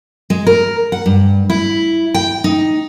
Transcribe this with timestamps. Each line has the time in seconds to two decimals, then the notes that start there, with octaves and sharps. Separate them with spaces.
0.30 G#3
0.47 A#4
0.92 F#5
1.06 G2
1.50 E4
2.14 G5
2.44 D#4